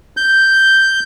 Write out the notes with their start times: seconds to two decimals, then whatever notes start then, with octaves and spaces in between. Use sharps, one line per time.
0.17 G6